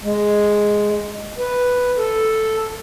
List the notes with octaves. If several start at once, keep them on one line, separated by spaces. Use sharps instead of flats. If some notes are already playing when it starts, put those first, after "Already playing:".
G#3
B4
A4